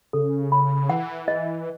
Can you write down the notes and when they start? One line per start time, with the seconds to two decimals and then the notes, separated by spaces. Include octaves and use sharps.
0.13 C#3 A4
0.52 B5
0.90 E3 F#5
1.28 D#5